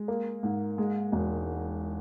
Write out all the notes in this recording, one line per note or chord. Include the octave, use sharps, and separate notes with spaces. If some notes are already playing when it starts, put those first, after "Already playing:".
Already playing: G#3
A#3
G#2
G#3
E1